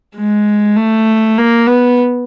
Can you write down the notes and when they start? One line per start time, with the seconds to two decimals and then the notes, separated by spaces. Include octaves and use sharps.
0.17 G#3
0.76 A3
1.38 A#3
1.67 B3